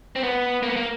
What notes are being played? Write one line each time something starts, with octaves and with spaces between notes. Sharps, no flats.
C4
B3
A#3
B3
A#3